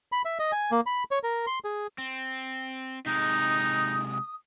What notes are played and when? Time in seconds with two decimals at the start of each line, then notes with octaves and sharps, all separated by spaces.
0.12 B5
0.25 E5
0.39 D#5
0.52 G#5
0.71 A#3
0.86 B5
1.11 C#5
1.23 A#4
1.47 C6
1.64 G#4
1.98 C4
3.06 C3 G#3 D#4 D#6